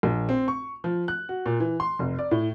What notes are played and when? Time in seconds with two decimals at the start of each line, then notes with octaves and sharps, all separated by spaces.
0.03 A#1
0.29 C4
0.48 C#6
0.84 F3
1.08 F#6
1.29 F#4
1.46 A#2
1.60 E3
1.80 C6
1.99 F1
2.19 D5
2.31 A2